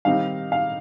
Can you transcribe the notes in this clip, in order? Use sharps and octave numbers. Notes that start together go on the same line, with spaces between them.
D#3 G3 C4 D#4 F5
F5